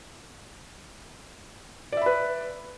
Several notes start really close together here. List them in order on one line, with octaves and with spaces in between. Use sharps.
D5 E5 B5 B4